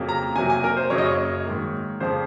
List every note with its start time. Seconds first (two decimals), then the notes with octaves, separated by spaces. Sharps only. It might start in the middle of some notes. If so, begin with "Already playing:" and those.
Already playing: F2 C#3 F#3 A#3
0.09 A#5
0.36 C3 F#3 A#3 G#5
0.50 G#5
0.64 A#4
0.77 C5
0.90 F#2 C#3 F#3 A#3 C#5
0.98 D#5
1.06 C#5
1.45 G#2 D#3 A#3
2.00 F2 C#3 F3 C5